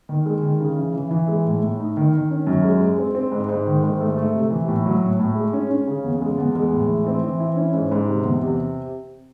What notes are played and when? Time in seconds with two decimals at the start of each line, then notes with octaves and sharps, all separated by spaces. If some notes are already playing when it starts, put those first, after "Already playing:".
0.09 D#3
0.26 G#3
0.43 D#3
0.60 C#3
0.78 E3
0.94 E3
1.11 E3
1.28 G#3
1.45 A2
1.62 A2
1.79 D#4
1.97 D#3
2.13 D#3
2.31 C#4
2.47 F#2
2.64 G#3
2.81 G#3
2.98 C4
3.15 C4
3.32 G#2
3.48 G#2
3.67 D#3
3.84 G#2
4.00 A3
4.17 A3
4.34 C3
4.50 E3
4.68 A2
4.86 F#3
5.03 A2
5.20 A2
5.35 G#3
5.53 C#4
5.70 C#4
5.87 C#3
6.04 E2
6.22 G#3
6.38 E2
6.55 G#3
6.72 A2
6.88 E3
7.07 C4
7.23 E3
7.40 E4
7.56 C#4
7.73 G#2
7.92 G#2
8.08 C3
8.24 E2
8.42 C3